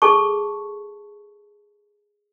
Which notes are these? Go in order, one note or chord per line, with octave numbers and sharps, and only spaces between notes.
G#4 A4 A5 C#6